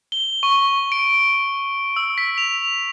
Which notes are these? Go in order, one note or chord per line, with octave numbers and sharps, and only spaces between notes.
G7
C#6
D7
E6
B6
F7